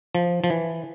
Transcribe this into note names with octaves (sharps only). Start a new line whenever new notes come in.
F3
F3
E3